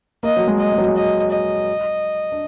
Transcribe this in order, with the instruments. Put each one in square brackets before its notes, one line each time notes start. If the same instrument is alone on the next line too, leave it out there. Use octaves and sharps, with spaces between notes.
[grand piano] A#3 [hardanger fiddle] D#5
[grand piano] F#3
G#3
[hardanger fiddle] D#5
[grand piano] G#3
F#3
G#3
[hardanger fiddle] D#5
D#5
[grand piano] D4